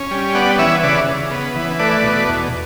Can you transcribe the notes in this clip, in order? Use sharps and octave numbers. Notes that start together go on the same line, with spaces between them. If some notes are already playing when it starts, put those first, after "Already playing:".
Already playing: C#4
G3
B3 D5 F#5
E3 C#5 E5
C#3 B4 D5
C#3
B3
E3
A3 B4 D5
B2
E2